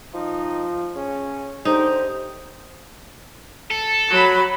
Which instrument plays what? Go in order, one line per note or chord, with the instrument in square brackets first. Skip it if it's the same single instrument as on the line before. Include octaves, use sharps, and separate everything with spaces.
[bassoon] F3 [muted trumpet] D#4
[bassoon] C#3 [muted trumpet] C#4
[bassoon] D3 [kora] D#4 [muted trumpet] G4 [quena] C5
[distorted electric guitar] A4
[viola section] F#3 B5